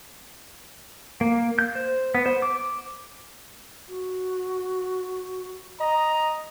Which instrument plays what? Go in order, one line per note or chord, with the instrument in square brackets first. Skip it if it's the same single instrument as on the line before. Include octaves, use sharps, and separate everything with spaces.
[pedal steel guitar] A#3
G6
C5
B3
C5
D6
[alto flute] F#4
[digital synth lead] D#5 [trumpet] A#5